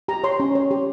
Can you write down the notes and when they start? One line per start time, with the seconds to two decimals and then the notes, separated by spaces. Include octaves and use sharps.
0.08 G4 A#5
0.24 C#5 C6
0.40 C#4
0.55 C#5
0.71 G4